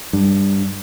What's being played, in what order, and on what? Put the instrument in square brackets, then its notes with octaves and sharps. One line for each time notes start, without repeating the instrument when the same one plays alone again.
[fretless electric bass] G2